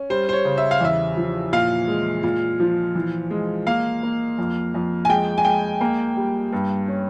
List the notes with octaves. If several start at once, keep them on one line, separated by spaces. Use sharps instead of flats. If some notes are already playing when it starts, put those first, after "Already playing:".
Already playing: C#4
G3 C5
C5
C#5
C#3
E5
F5
E2 E5
F3
A#2 F5
G#3
A#2
F3
E3
G#3
A#3 F5
A#3
F2
F2
G#5
G#3 G5
G#5
G#3 G5
A#3
G3
G2
C#4